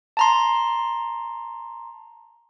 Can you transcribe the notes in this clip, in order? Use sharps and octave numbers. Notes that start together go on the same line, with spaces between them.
A5 A#5 C6